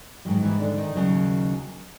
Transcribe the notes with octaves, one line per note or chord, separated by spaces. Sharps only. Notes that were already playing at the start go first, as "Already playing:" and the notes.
G#2 D#3 F#3
E3 E4
D3 D4
D#3 D#4
D#2 C#3 F#3